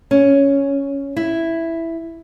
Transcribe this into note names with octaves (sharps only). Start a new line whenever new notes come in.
C#4
E4